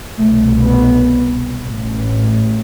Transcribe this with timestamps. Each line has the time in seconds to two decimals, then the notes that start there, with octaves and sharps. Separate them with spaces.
0.18 C2 B2 A3
0.55 B3
1.64 A1 A2